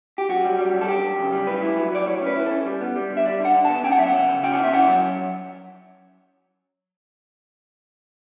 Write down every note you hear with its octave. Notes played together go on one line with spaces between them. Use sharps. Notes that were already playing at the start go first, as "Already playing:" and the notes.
G4
F#2 F#4
G3
G3
F#2
A4
F#2 G4
F#2
C#3
G3
A2 B4
E4
F#3
F#3 D5
A2 C#5
C#4 B4
E4 B4
C#4 A4
G3
B3
G3
D3
E5
G3 D5
D3 F#5
D3
B3 A5
C#4 G5
F#5
F#3 E5
F#5
C#3
C#3
C#4 G5
F#5
C#3 E5
C#4 F#5
F#3